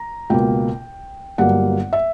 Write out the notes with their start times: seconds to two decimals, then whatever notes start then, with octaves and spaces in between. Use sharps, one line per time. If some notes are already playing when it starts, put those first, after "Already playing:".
Already playing: A#5
0.30 C#2 B2 A#3 G5
1.38 G1 G2 F#3 A#3 F#5
1.93 E5